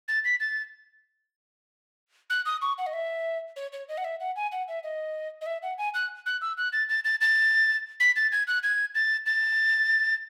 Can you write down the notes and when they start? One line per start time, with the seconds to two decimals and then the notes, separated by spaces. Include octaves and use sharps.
0.08 A6
0.25 B6
0.40 A6
2.30 F#6
2.45 D#6
2.62 C#6
2.78 F#5
2.86 D#5
2.93 E5
3.56 C#5
3.73 C#5
3.88 D#5
3.97 F#5
4.04 E5
4.20 F#5
4.36 G#5
4.52 F#5
4.68 E5
4.83 D#5
5.41 D#5
5.46 E5
5.62 F#5
5.78 G#5
5.94 F#6
6.26 F#6
6.41 E6
6.58 F#6
6.73 A6
6.89 A6
7.04 A6
7.21 A6
8.00 B6
8.16 A6
8.32 G#6
8.47 F#6
8.63 G#6
8.95 A6
9.26 A6